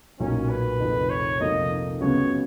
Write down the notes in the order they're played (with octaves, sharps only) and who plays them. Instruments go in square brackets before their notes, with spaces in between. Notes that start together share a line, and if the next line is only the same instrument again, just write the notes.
[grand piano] B1 A#2 F#3 A#3 [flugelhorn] C#4
[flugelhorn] B4
[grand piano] F1 F2 D#3
[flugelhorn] C#5
[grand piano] F1 F2 F3 A#3 D#4 [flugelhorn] D#5
[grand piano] C#2 C#3 F#3 B3 [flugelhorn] C#5